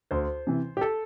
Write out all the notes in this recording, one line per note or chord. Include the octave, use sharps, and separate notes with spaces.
D2 C5
C3 E3
G4
A4